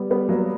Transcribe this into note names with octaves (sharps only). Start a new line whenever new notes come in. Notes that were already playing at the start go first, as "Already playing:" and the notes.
Already playing: G3 B3
G3 B3
F#3 A#3